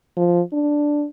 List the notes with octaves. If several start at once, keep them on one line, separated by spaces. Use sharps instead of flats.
F3
D4